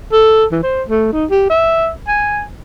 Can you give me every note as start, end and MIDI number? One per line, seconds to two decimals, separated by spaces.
0.13 0.45 69
0.52 0.59 52
0.63 0.83 72
0.89 1.10 57
1.13 1.25 63
1.30 1.46 67
1.50 1.89 76
2.08 2.42 80